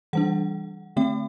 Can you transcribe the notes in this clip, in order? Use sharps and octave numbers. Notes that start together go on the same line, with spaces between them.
E3 G3 D4 F#5
D3 A3 C4 G5